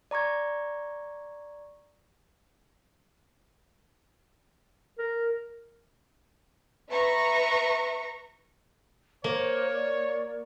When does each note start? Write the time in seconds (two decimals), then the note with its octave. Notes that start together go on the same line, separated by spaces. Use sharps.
0.11 D5 A#5 C#6 G#6
4.99 A#4
6.91 B4 E5 A#5 C#6
9.24 A#3 C5 C#5
9.74 D5